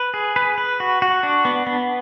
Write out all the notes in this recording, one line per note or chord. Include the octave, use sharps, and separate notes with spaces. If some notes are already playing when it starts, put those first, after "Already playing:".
Already playing: B4
G#4
B4
B4
F#4
F#4
D4
B3
B3